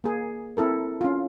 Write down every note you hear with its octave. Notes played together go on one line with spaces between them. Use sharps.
A#3 G#4
C4 E4 A4 A#4
C#4 F4